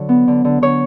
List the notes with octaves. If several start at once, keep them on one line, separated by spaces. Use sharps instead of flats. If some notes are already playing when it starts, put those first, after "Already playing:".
Already playing: D3 F#3 C#5
B3
D3
D3
D3 C#5